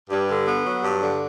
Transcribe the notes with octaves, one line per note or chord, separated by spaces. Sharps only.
G2
D3
B3
F#3
G2
D3